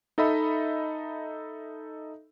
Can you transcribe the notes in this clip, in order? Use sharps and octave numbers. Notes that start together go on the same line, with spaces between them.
D#4 A4 D#5 E5 B5